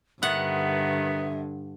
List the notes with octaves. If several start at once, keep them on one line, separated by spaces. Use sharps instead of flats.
G2 D3 D#3 B3 E5 F#5